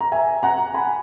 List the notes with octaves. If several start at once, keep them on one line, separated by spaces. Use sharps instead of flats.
A#5
E5 G#5
F#5 A#5
G#5 B5